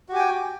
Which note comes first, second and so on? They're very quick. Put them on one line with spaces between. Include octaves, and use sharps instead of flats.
F#4 G4 G#5 G5